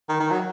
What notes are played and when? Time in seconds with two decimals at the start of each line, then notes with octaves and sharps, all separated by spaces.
0.09 D#3
0.20 D#3
0.31 F#3